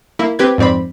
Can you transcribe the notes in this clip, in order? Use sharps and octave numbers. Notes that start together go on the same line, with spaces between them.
A#3 E4
C4 G4 B4 G#6
F2 G#2 C4 D5 B5